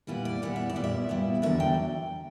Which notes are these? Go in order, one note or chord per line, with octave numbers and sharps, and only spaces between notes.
A#2 G3 B3 E4 B4
D5
A#2 G3 B3 E4 F#5
E5
D5
A#2 G3 B3 E4
E5
A#2 G3 B3 E4
E2 D3 F#3 A#3 D4 E5
G5